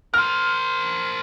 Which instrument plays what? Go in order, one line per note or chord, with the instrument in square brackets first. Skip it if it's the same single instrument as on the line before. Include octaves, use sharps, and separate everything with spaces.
[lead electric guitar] A#4 C5 [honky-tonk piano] F6